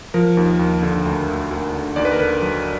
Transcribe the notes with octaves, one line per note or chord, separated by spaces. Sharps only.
F3 A#4
D#2
D#2
D3
D2
D2
D2
D3
D#2 D5
B4
A#4
D3 B4
F#3